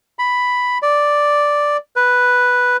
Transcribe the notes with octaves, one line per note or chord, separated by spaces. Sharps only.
B5
D5
B4